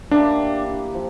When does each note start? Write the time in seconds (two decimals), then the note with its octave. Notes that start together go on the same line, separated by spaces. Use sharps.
0.11 A#3 D4 E4 G4
0.94 F3